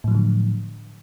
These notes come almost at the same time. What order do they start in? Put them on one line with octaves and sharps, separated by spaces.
A2 F3 F#3 D3